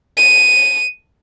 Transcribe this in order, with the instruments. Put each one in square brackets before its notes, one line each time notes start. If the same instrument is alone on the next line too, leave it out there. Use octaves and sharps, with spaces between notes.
[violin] D#7